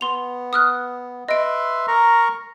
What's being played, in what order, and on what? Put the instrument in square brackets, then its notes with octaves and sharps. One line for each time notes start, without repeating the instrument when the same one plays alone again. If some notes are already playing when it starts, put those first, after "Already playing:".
[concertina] B3 [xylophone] C6 F7
[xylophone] D#6 F6 F#6
[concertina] B4 E5 C6 [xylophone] D#5 D7
[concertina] A#4 A#5 C#6